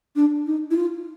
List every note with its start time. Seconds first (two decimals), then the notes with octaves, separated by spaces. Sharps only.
0.16 D4
0.47 D#4
0.71 E4
0.76 F4